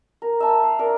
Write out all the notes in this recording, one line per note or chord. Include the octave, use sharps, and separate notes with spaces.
A#4
E5 A5
F5
D4 A#4